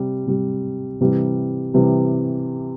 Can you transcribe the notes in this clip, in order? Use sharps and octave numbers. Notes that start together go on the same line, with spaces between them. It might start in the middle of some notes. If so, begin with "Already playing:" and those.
Already playing: C3 G3
C3 G3
C3 E3 G3
C3 E3 G3